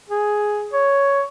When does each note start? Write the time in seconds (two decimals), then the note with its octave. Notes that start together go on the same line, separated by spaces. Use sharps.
0.09 G#4
0.72 C#5